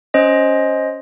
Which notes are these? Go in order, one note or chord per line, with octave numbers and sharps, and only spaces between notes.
C#4 C5 D#5